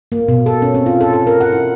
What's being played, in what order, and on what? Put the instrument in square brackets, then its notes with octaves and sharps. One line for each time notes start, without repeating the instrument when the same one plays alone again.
[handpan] A#3
B2
A4
C#4
C4
F4
A4
A4
A#4
F#5
E4